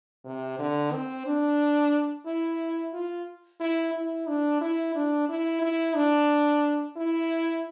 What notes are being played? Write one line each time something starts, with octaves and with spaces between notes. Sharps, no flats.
C3
D3
C4
D4
E4
F4
E4
E4
D4
E4
D4
E4
E4
D4
E4